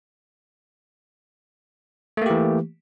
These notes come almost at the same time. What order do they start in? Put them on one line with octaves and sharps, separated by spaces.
A3 A#3 G4 E3